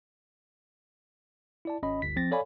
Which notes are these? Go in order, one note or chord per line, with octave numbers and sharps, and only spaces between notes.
E4 D5 A5
G#1 C#4 D#5 B5
G1 D2 B6
F3 C4 A6 A#6
A4 C#5 D5 F5 G#5 B5